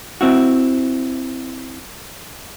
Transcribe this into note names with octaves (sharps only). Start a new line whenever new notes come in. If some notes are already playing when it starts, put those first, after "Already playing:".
C4 E4 F#4